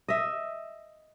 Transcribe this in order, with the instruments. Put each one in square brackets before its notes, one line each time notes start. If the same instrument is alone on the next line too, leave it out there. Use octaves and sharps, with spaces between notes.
[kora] D#5 E5